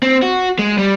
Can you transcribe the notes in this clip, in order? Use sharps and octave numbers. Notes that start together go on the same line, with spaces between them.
C4
F#4
G#3
G3